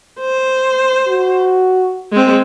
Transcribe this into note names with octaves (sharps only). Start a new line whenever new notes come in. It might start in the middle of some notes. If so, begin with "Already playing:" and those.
C5
F#4
G#3 C4